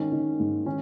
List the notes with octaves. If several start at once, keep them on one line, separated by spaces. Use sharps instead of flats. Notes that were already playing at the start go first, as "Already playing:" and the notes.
Already playing: G#2 D#3 C#4
D#3
G#2
D#3 C#4